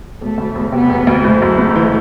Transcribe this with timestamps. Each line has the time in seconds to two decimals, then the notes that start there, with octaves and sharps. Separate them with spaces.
0.21 E1 A3
0.38 D2
0.55 E1
0.72 C3 B3
0.89 E1
1.07 D2
1.24 F#1 A3
1.42 F#2
1.58 F#1
1.76 E3